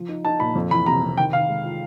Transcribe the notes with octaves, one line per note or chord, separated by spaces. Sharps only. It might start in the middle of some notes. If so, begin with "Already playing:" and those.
Already playing: F3
D#4
D#4 A5
A#2 B5
F2
E3 B5
C3 A#5
C3
D#3 G5
D#3 F5
G#3
F4